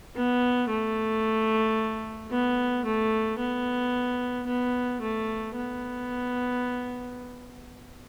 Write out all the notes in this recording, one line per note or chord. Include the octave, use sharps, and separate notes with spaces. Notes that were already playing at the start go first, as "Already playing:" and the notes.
B3
A3
B3
A3
B3
B3
A3
B3